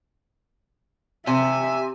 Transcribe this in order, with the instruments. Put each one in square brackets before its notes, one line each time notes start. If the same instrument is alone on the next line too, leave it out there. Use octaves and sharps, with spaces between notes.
[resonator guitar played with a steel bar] C3 [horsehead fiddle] E5 [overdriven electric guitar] G#5